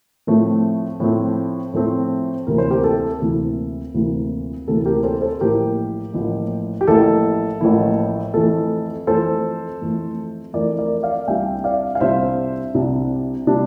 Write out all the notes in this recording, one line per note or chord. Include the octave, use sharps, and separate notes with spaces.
A2 F3 A3 C4
A2 F3 A3 C4
A2 F3 A3 C4
D2 C3 E3 A#3 E4 A#4
C5
G4 A#4
A4
D2 C3 E3 A#3 E4
D2 C3 E3 A#3 E4
D2 C3 E3 A#3 E4 A4
G4 A#4
A4 C5
A4 C5
A1 A2 F3 A#3 E4 G4 A#4
A1 A2 F3 A#3 E4
G4
A1 A2 F3 A#3 E4 A4
A1 A2 F3 A#3 E4
F2 E3 A3 A4
F2 E3 A3 A4 C5
F2 E3 A3
F2 E3 A3 A#4 D5
A#4 D5
D5 F5
C2 C3 G3 D4 E5 G5
D5 F5
F5
C2 C3 G3 D4 C5 E5
C2 C3 G3 D4
C3 G3 D4